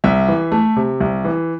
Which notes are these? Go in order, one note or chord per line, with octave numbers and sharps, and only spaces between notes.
C2 E5
E3
A3
C3
C2
E3